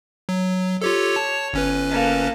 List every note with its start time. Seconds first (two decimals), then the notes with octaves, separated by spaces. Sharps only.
0.29 F#3
0.82 F4 G4 A4 C#5
1.16 A5
1.53 G1 C#4 B4
1.90 A#3 A4